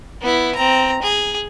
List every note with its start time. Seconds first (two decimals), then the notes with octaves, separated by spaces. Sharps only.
0.21 B3 E4
0.55 C4 A#5
1.02 G#4